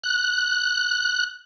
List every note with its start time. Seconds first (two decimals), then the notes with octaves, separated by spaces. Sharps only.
0.04 F#6